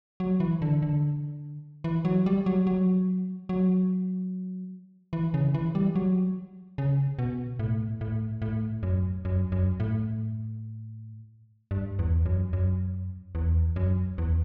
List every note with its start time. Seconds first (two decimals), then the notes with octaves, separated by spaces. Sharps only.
0.20 F#3
0.40 E3
0.62 D3
0.82 D3
1.84 E3
2.05 F#3
2.26 G3
2.46 F#3
2.67 F#3
3.49 F#3
5.13 E3
5.34 C#3
5.54 E3
5.75 G3
5.96 F#3
6.78 C#3
7.19 B2
7.59 A2
8.01 A2
8.42 A2
8.83 F#2
9.25 F#2
9.52 F#2
9.80 A2
11.71 G2
11.99 E2
12.26 F#2
12.53 F#2
13.35 E2
13.76 F#2
14.18 E2